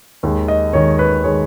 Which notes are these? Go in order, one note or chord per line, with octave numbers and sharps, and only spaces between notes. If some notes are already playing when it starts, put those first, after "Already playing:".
D#2 D#3 G#3
D#5
D#2 D#3 G#3 C#5
B4
D#3 G#3 C#5